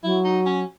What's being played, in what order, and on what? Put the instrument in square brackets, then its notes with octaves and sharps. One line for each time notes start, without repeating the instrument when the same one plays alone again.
[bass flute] F#3 [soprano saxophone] E4
[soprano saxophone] D#4
C#4